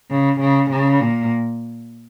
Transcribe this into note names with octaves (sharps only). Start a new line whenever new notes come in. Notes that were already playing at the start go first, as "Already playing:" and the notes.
C#3
C#3
C#3
A#2